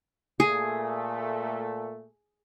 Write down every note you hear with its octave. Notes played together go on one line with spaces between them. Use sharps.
A#2 A3 G#4